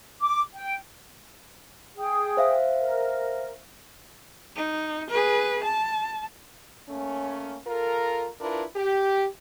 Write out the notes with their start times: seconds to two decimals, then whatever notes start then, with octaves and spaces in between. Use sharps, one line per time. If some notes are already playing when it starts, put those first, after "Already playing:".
0.21 D6
0.53 G5
1.97 G#4 G5 D#6
2.37 C5 E5 F5
2.79 A#4
4.56 D#4
5.10 G#4 B4
5.63 A5
6.89 A3 A#3 C#4
7.67 F4 A4 A#4
8.41 D4 E4 F4 A#4 B4
8.76 G4